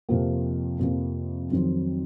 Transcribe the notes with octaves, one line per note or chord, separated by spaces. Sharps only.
F2 C3 F3 A#3
F2 C3 F3 A#3
F2 D#3 F#3 C4